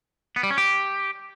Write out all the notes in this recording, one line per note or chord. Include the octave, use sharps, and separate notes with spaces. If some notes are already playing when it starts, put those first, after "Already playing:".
B3
G3
C#4
G4